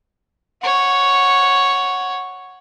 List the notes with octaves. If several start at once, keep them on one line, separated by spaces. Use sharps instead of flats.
C#5 F#5